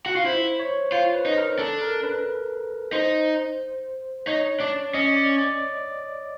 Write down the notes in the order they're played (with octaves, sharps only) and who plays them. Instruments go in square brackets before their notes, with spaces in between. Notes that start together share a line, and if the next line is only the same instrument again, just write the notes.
[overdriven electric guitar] F#4
F4
[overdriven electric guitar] E4 [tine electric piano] C5
[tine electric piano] C#5
[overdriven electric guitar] F4 [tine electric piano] C5
[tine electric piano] B4
[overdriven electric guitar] D#4
[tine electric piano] A#4
[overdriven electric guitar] D4 [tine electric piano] A4
[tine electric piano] A#4
B4
[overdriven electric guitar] D#4 [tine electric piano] C5
[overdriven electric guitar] D#4 [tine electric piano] C#5
[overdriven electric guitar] D4 [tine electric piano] D5
[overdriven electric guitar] C#4 [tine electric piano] D#5
[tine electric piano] D5
D5